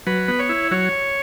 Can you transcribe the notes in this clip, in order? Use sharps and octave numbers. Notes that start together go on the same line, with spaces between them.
F#3 B4
B3
C#5
E4
F#3 C#5